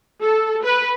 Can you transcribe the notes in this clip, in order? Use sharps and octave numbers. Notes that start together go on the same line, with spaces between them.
A4
B4